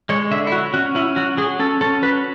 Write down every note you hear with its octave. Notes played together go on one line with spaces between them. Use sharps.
G#3 C#5
D3 E5
E4
F#3 F#4
C#4 F#4
C#4 E4
F#3 F#4
F#3 G#4
C#4 A4
C#4 A4
F#3 B4